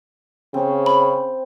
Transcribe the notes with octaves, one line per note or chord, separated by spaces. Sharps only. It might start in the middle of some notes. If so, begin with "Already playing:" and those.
C#3 C4
B5